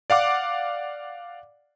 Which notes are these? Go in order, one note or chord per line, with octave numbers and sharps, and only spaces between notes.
D5 F5 F#5 D6